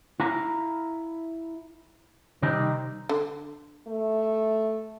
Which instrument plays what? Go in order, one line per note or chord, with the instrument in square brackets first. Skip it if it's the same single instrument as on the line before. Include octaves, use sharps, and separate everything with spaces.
[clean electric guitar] E4 F5 A#5
C3 D#3 G3 C4 D#4
[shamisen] D3
[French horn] A3